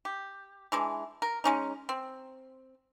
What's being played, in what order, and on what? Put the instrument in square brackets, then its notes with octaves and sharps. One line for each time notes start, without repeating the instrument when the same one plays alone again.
[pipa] G4
E3 G#3 D4
A#4
G#3 C#4 D#4
C4